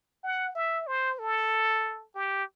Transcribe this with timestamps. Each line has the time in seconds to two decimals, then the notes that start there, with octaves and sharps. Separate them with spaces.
0.23 F#5
0.55 E5
0.87 C5
1.19 A4
2.15 G4